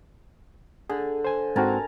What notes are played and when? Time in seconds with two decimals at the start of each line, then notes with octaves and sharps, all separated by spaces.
0.90 D3 G#4
1.25 C5 G#5
1.56 G#2 C4 F#4 A#4 G#5 A5